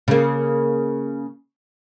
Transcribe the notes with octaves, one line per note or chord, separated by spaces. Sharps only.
C#3 A#3